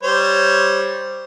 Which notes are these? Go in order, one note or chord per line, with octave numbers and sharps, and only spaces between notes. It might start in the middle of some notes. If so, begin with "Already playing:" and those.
G3 C5 C#5